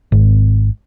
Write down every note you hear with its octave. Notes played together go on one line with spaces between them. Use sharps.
G#1